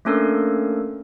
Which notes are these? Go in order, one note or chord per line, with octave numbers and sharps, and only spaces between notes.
A3 A#3 C#4 D4 A4 A#4